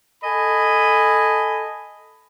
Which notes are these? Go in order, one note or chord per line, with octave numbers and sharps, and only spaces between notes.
A4 D#5 G#5 B5